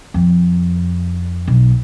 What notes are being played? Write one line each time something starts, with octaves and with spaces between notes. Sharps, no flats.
F2
B1